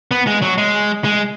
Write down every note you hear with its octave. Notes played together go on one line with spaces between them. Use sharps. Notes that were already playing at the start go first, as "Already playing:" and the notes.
B3
G#3
F#3
G#3
G#3